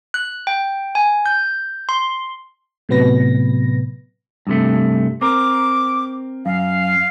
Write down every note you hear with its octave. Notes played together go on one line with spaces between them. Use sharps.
F#6
G5
G#5
G6
C6
A2 C3 F#3 B3 B4 A#6
G2 C3 A3
C4 A#4 D6
F#2 F5